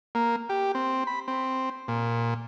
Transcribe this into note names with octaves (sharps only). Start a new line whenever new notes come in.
A#3
G4
C4
B5
C4
A#2